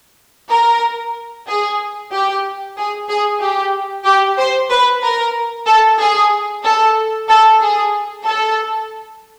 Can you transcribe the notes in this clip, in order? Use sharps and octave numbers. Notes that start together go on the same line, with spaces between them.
A#4
G#4
G4
G#4
G#4
G4
G4
C5
B4
A#4
A4
G#4
A4
A4
G#4
A4